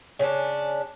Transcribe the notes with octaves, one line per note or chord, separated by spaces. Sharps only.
C#3 C#4 D4